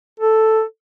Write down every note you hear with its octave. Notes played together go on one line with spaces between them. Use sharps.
A4